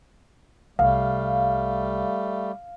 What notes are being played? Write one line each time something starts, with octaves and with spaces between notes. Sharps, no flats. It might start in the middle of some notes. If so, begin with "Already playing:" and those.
C2 G3 A3 F5